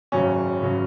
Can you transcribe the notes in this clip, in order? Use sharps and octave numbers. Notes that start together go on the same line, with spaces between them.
G#1 F#2 C#3 F#3 C#4
G#1 C#3 F#3